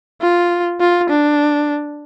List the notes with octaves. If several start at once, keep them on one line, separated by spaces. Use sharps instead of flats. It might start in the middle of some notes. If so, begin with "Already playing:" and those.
F4
F4
D4